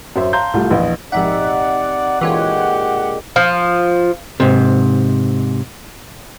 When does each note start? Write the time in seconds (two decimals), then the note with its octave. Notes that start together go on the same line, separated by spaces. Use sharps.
0.16 F#2 C5 E5
0.33 F5 A5 A#5 C6 G6
0.54 C2 G3 A3 F4
0.71 A#1 E2 D#4 B4
1.12 A#1 G#2 C3 D#4 D5 E5 F#5
2.21 A#2 D3 E3 G#3 F4 G4 C#5
3.36 F3
4.40 G#2 C3